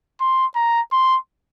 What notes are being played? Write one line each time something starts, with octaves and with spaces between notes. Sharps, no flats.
C6
A#5
C6